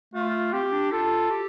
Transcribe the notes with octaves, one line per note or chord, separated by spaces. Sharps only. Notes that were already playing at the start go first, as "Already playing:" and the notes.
A3 F4
C4 G4
D4
F4 A4
G4